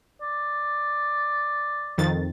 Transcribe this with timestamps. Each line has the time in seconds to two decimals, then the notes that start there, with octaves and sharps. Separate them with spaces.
0.22 D5
1.98 F2 D#3 A6